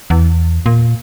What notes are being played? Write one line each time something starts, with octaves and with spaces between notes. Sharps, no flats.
E2
A#2